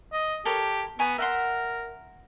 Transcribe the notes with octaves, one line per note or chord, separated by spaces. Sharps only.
D#5
G4 A4 A#4 C#5
B3 G#5 A#5 C#6
A#4 E5 F#5 C6